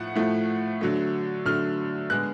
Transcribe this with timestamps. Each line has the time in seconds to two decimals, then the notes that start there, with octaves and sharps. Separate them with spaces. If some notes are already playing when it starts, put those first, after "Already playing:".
Already playing: A2 F3 A3 F#5
0.16 A2 F3 A3
0.81 D3 F#3 A3
1.45 D3 F#3 A3 F6
2.10 D3 G#3 B3 F#6